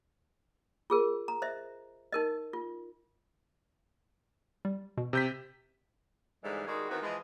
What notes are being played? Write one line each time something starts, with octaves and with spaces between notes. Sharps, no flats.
F4 G#4 A#4
A#5
C5 D#5 E5
D#4 A#4 D#5
F4
G3
B2
C3 G6 B6
G#2 D3 E3 G3 G#3
D#3 G3 G#3 F#4 G#4
D#3 E3 B3 C4 F#4
E3 F3 G#3